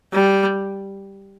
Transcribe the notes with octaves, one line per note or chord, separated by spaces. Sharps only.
G3